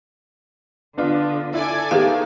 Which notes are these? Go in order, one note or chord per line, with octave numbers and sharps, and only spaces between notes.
D3 B3 D4 F4
E4 A4 D5 G#5
D#3 A#3 B3 G4 G#4 F5